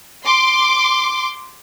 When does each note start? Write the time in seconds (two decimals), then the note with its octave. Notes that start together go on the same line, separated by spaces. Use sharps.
0.24 C6 D6